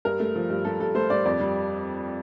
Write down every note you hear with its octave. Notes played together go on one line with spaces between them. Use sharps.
G2 A#4
A3
F3
G2
G2 A4
G2 A4
A3 C5
G2 D5
F2 D5
G3